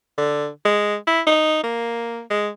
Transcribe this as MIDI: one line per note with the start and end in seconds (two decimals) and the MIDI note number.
0.18 0.48 50
0.65 0.96 56
1.07 1.21 64
1.27 1.60 63
1.63 2.21 58
2.30 2.49 56